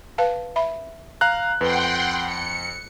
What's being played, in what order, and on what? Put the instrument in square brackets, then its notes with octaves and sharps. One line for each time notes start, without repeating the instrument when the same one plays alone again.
[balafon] B4 F5 A5
E5 B5
[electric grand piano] F5 A#5 F#6
[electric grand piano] F2 [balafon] B4 [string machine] F#5 G5 C6
[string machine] C#7